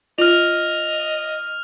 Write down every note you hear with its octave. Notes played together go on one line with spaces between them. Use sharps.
F4 D#5 F6 F7